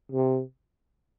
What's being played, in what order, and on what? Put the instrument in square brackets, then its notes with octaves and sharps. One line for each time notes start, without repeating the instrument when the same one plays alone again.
[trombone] C3